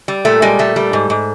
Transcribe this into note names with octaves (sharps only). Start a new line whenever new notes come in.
G3
A#2 A3
G3 G#3
A#2 A3
G3
G#2
G#2